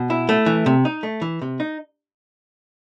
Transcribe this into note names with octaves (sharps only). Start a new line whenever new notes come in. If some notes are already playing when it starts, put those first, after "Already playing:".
Already playing: B2
E4
A3
E3
C3
D#4
A3
E3
C3
D#4